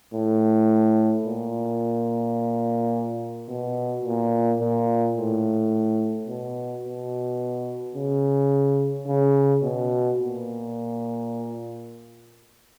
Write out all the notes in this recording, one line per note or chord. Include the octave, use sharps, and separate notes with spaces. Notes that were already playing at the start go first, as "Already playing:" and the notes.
A2
A#2
B2
A#2
A#2
A2
B2
B2
C#3
C#3
B2
A#2